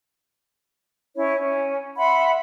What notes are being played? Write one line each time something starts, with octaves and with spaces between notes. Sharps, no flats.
C#4 E4 C#5
C#4
E5 F#5 B5 C6